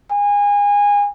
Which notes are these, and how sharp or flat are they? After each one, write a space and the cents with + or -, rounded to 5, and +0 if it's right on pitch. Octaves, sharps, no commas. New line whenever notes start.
G#5 -25